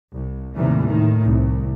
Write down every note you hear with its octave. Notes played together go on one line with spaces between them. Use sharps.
C2
D#2 A2 C3 D#3 E3 G3
A2 D#3
C2